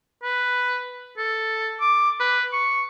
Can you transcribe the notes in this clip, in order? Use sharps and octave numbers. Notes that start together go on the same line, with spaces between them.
B4
A4
D6
B4
C#6